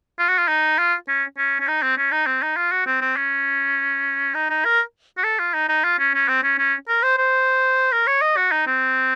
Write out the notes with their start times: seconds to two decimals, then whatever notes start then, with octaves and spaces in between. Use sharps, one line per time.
0.19 F4
0.29 F#4
0.38 F4
0.48 D#4
0.79 F4
1.08 C#4
1.38 C#4
1.60 C#4
1.68 D#4
1.82 C4
1.98 C#4
2.12 D#4
2.26 C4
2.42 D#4
2.57 F4
2.72 F#4
2.87 C4
3.01 C4
3.16 C#4
4.35 D#4
4.50 D#4
4.65 A#4
5.18 F#4
5.24 A4
5.39 F4
5.54 D#4
5.69 D#4
5.84 F4
5.99 C#4
6.14 C#4
6.28 C4
6.43 C#4
6.58 C#4
6.88 A#4
7.03 C5
7.17 C5
7.92 A#4
8.07 C#5
8.22 D#5
8.37 F#4
8.52 D#4
8.67 C4